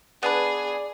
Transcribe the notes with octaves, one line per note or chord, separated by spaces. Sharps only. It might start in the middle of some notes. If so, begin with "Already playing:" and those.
B3 D4 G#4 B4 D5